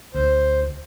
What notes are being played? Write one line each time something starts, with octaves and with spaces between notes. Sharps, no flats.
D2 C5